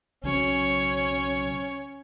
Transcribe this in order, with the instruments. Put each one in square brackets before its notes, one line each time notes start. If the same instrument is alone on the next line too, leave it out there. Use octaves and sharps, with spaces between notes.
[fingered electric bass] B1 C#3 F#3 [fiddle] C#4 C#5